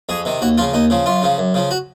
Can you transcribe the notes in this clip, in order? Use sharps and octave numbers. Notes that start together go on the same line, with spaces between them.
F2 G#4
C3 D#3
D#2 F#4
C#3 F3 F4
D#2 D#4
C#3 F3
F#2 F4
C#3 F3
F#2
C#3 F3
F#4